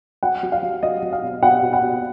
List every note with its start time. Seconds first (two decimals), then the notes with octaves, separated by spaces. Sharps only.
0.23 F#3 F#5
0.43 F#3
0.52 F5
0.62 F#3
0.83 F#3 D#5
1.02 F#3
1.12 F5
1.23 B2
1.42 B2 F#5
1.62 B2
1.73 F#5
1.82 B2